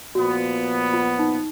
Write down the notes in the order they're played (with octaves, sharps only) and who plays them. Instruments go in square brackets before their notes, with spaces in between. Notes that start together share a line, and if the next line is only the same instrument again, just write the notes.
[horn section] A#2 F3 B3 [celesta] F#4
[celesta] F4
D#4